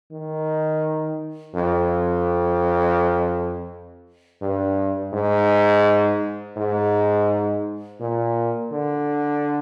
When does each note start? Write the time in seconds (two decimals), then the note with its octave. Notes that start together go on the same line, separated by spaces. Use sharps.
0.12 D#3
1.55 F2
4.42 G2
5.13 G#2
6.57 G#2
8.00 A#2
8.72 D3